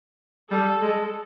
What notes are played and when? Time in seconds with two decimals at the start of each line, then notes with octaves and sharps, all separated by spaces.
0.51 G3 A4
0.82 G#3